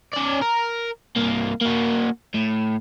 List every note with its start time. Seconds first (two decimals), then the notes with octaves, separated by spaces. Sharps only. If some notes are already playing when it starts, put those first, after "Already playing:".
0.13 C#4 D5
0.42 A#4
1.16 C2 A#3
1.61 A#3 F#4
2.35 A2